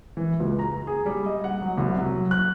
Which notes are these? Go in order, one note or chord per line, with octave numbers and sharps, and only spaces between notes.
E3
C#2
A#5
G#4
G3
D#5
F#5
F#3
C2
F#3
F#6